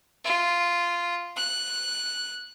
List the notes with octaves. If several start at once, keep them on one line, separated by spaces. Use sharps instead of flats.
F4
F#6